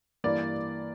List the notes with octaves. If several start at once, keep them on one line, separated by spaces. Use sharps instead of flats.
G2 E3 A#3 D5